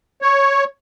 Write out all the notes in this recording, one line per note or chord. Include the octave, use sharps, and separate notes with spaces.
C#5